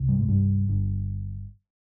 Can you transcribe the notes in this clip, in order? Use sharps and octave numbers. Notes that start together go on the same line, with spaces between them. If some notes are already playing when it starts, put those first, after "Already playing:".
Already playing: C2 C3
G2 G3
G#2 G#3
G2 G3
G1 G2 D3